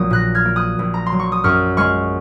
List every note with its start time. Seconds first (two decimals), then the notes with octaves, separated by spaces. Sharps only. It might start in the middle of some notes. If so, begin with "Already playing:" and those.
Already playing: A#1 F#3 A#3 D#6
0.10 A#2 F#6 A#6
0.35 F6 G#6
0.45 A#3
0.56 D#6 F#6
0.79 A#1
0.94 A#5
1.06 C6
1.12 F#3
1.19 C#6
1.32 D#6
1.44 F#2 C#6 F6
1.77 G#3 C#6 F6